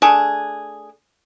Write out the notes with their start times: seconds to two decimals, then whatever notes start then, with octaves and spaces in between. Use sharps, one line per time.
0.02 A3 D4 G#4